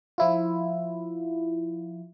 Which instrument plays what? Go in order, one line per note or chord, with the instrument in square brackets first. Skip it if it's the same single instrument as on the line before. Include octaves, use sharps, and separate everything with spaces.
[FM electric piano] F3 E4 F4